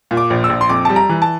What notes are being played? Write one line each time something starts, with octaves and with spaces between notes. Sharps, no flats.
A#2
D6
A#1
E6
A#1
C6
F2 D6
G3 A5
A#5
E3
A5